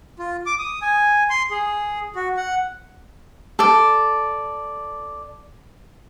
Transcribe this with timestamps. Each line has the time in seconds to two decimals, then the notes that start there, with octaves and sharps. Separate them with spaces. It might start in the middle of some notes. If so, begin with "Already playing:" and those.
0.19 F4
0.46 D6
0.59 D#6
0.82 G#5
1.30 C6
1.51 G#4
2.16 F#4
2.37 F#5
3.59 A4 D5